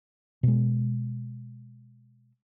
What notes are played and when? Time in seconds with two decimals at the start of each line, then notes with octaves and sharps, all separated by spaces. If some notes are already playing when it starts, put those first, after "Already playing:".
0.43 B2 G#3